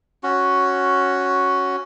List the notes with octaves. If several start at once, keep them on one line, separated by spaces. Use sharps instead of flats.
C#4 F#4